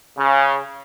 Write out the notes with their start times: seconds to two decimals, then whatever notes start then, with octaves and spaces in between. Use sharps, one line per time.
0.18 C#3